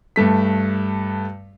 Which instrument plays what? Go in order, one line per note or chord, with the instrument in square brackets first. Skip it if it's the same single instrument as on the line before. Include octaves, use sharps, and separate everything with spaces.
[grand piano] G2 A3 B6